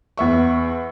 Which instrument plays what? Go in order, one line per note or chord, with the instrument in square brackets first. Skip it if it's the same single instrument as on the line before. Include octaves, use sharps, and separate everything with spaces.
[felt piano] E2 E5 C#6